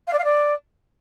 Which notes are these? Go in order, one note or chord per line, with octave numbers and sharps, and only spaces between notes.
F5
D5
F5
D5